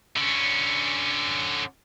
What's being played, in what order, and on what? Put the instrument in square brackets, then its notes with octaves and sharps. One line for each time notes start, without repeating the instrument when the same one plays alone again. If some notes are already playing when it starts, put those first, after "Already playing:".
[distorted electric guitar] D3 C#4